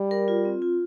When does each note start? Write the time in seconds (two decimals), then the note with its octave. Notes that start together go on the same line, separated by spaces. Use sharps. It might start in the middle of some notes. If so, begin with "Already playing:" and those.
Already playing: G3
0.11 A#4
0.28 F4
0.45 C4
0.62 F4